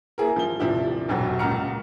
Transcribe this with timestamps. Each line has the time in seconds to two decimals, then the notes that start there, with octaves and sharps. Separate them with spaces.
0.18 A#3 E4 G#4 A#4
0.36 F3 G3 G7
0.60 D#1 C3 F3 D4 E4
1.09 F1 A#1 F2 B2 F#3
1.39 C#2 A#2 F#5 A#5 F6 C#7